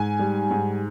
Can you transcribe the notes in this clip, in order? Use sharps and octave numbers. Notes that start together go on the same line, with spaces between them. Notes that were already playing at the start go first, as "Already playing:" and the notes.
Already playing: G#2 G#5
G3
G#2